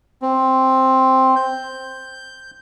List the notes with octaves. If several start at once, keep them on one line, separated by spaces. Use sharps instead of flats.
C4
G6